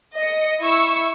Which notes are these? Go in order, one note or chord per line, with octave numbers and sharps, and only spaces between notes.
D#5 C#7
E4 C#6 E6